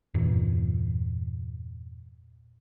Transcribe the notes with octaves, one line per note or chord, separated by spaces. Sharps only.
E2 G2 A#2 E3